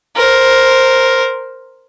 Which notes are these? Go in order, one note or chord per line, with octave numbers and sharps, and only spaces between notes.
A#4 C5